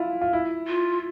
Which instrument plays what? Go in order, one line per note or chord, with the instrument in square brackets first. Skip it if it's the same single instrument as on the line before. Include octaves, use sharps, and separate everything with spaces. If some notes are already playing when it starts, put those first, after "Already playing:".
Already playing: [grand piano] E4 F4
F4
E4
[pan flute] F4